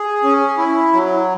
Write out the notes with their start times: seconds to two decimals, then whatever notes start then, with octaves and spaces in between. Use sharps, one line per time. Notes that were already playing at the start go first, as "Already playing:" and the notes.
Already playing: G#4
0.24 C#4
0.58 E4
0.93 F#3